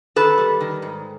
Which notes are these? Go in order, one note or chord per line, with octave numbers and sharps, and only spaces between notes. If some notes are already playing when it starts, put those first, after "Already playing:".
D#3 A4 B4
G3
D#3
G#2